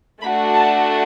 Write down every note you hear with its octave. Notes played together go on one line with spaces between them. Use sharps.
A3 D4 F#4 B5
A5